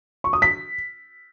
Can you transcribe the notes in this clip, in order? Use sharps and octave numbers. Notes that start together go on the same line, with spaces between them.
C#6
D#6
B6